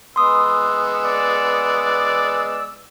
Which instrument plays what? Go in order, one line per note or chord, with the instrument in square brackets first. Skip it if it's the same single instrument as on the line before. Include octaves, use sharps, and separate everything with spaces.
[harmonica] G#3 B3 E6 [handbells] C6 D#6
[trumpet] D5